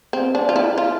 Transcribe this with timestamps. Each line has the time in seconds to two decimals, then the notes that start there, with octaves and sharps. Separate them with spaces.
0.13 C4
0.35 D4
0.49 F4
0.56 E4
0.78 F4